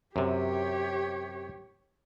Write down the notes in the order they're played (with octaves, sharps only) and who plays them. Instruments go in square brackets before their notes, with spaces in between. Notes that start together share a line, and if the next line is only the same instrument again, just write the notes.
[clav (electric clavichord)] F#2 C3 [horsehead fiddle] G4 C#5